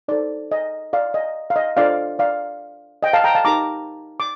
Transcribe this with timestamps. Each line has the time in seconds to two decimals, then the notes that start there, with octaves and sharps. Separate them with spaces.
0.08 D#4 A4 C5 D5
0.52 D#5
0.93 D5 F5
1.14 D#5
1.50 F5
1.56 D#5
1.77 D4 F4 A4 C5 D5 F5
2.19 D5 F5
3.03 D#5 G5
3.13 F5 A5
3.24 G5 A#5
3.35 F5 A5
3.45 D#4 G4 A#4 A#5 D6
4.20 D6